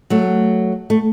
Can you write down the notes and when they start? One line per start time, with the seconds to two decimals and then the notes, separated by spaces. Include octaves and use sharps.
0.10 F#3 A3
0.90 A3